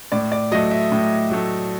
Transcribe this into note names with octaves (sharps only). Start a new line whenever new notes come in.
A2 D5
D5
F#3 A3 D#5
E5
A2
F#3 A3